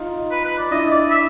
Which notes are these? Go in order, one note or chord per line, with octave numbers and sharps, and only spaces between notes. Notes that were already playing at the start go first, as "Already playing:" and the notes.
Already playing: D#4 F4
B4
B4
D5
D4 E4 D#5
D5
E5